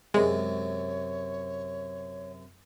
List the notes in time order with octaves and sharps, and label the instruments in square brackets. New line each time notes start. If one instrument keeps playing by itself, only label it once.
[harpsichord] F#2 C3 [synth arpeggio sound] G#3 [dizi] C#5